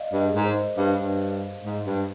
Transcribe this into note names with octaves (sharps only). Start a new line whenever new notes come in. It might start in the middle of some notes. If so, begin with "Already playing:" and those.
Already playing: D5 D#5 F5
G2 D#5
G#4
G#2 A#4
C5
D#5
G2 F5
G2
G#2
G2